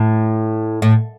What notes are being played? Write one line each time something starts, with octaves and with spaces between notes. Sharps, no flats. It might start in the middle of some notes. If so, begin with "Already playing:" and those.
Already playing: A2
A2